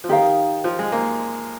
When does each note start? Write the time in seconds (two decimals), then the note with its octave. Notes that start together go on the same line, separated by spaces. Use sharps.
0.04 F3
0.09 D#3 D#4 G4 A#4 F5
0.64 F3
0.79 G#3
0.92 A#3